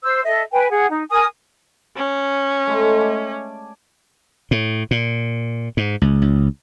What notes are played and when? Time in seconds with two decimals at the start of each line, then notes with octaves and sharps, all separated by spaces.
0.03 C5 E6
0.25 A4 D#5 E5
0.52 B4 G5 G#5
0.71 G#4 F#5
0.91 D#4
1.10 A#4 G#5 D#6
1.96 C#4
2.67 G#3 A3
3.01 D5 G#5 A5
4.51 A2
4.91 A#2
5.77 G#2
6.02 C#2
6.22 C#2